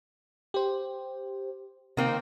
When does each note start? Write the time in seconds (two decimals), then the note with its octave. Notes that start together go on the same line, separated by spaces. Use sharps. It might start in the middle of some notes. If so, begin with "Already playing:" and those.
0.54 G4 C5
1.97 C3 D#3 A#3 C4